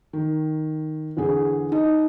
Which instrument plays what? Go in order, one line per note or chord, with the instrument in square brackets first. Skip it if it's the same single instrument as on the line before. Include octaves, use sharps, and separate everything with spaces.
[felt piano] D#3
E2 D3 G#4
[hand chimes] D#4 [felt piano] D#5